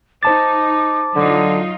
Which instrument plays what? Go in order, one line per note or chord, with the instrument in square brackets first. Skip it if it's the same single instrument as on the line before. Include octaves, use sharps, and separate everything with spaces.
[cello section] D#4 [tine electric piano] C5 A5 A6 [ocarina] D6
[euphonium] D3 [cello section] F#3 D#4 F4